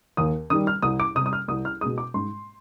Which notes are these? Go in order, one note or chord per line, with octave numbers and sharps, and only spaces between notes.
D#2 D#6
D#3 G3 D#6
F6
C2 D#6
D6
C3 G3 D#6
D#6
F6
C2 D#6
F6
B2 G#3 D#6
D6
G#2 C6